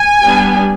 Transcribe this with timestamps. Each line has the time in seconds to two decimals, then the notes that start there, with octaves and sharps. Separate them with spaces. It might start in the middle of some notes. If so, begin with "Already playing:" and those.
Already playing: G#5
0.21 G3 B3 D4